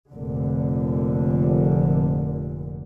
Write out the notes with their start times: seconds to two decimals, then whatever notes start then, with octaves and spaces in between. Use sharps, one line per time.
0.11 F1 A#2 D3